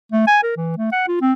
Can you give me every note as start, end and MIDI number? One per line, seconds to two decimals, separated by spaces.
0.12 0.24 57
0.28 0.40 80
0.43 0.52 70
0.57 0.74 52
0.78 0.90 57
0.92 1.06 78
1.08 1.17 65
1.21 1.33 60